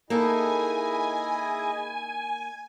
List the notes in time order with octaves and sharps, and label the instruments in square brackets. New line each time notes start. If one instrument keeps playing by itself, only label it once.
[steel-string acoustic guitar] A#3 D#4 A4 [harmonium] E4 G#4 D#5 [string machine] G#5